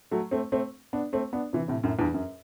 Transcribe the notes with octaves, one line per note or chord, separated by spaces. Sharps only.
F#3 A3
A3 C4
A3 C4
B3 D4
A3 C4
B3 D4
C3 E3
A2 C3
F#2 A2
E2 G2
F#2